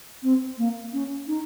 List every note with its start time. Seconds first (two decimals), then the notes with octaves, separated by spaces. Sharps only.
0.23 C4
0.58 A#3
0.93 C#4
1.28 D#4